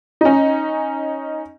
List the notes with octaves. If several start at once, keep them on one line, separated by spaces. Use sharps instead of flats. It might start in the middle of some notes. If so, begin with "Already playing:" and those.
C#4 D#4